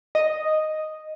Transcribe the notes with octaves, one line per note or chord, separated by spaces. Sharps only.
D#5